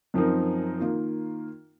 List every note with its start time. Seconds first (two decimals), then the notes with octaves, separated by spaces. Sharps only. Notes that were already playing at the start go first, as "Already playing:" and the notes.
0.14 F#2 F3 C4 D#4 A#4
0.80 D#3 A#3 F4